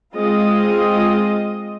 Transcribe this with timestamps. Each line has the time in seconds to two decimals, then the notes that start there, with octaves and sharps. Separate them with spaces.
0.14 G#3 C4 F4 D#5